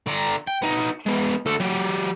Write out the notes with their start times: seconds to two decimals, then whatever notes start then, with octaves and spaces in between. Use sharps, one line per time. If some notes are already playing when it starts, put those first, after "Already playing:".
0.07 D3 A#5
0.47 G5
0.62 B3 D#4
1.06 G#3 B3
1.46 D2 A4
1.60 F#3 G4